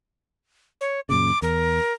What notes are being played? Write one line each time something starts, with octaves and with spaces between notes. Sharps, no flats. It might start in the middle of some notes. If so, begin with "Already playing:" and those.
C#5
F#2 A#2 C#3 D6
E2 A#4